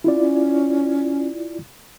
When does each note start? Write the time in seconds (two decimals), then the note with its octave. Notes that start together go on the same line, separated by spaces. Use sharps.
0.04 C#4 E4 F4 D5
0.20 C#4